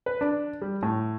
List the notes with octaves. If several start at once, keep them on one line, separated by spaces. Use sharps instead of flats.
B4
D4
G3
A2